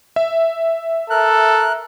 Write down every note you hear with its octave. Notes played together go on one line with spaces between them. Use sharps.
E5
A4 A#4 F#6